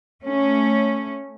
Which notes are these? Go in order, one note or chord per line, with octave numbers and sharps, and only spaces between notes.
A3 C#4